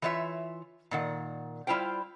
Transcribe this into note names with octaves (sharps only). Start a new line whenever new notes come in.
E3 F4 C#5 D#5 E5
A#2 D#3 F#5
G3 E4 F4 C5 G5